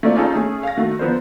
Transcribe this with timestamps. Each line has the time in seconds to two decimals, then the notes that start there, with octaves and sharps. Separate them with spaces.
0.03 A3 A#3 C4 F4 D5
0.16 C#4 D#4 F4 G#4 A4
0.36 A3 C#4 G#4
0.63 F5 A#6
0.77 D#3 A3 F#4
0.99 D3 F3 B3 A#4 C5